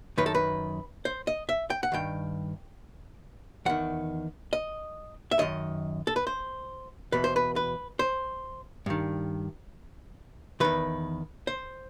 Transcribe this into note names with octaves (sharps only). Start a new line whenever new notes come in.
F#2 D#3 B4
A4
B4
C5
D#5
E5
G5
F#5
G2 D#3 G5
E2 D#3 F#5
D#5
E5
F#2 D#3 D#5
A4
B4
C5
E2 B2 B4
C5
B4
B4
C5
G2 D#3
E2 D#3 B4
C5